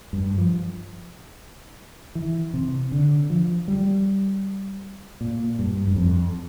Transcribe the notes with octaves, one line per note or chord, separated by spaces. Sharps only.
G2
F3
E3
C3
D3
F3
G3
A#2
G2
G2
F2